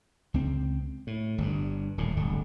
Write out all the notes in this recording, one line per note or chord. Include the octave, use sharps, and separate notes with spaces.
C#2 C4
A2
G1 G2
D#1 A2
D1 G1 D3